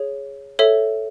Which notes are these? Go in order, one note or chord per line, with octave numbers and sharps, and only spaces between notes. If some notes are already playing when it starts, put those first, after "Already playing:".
Already playing: G#4 C#5
A4 C#5 E5